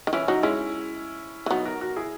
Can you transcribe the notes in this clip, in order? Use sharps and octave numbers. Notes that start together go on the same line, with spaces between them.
D#3
E3 C#4 E4
F#3 D#4 F#4
G#3 C#4 E4
E3
F#3 B3 D#4
F#4 A#4
F#4 A#4
E4 G#4